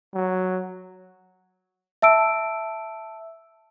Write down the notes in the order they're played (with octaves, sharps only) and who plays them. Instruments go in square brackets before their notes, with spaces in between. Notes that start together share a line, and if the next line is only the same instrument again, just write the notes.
[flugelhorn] F#3
[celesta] E5 A5 E6 D7